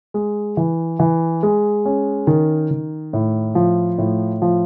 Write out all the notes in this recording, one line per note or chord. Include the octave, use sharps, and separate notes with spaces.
G#3
E3
E3
G#3
C#4
D#3
D#3
A2
F3
A2
F3